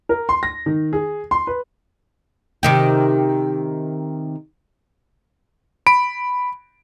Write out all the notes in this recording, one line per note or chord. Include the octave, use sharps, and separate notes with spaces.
A#4
C6
A#6
D#3
G#4
C6
B4
C3 D#3 G4
B5 D7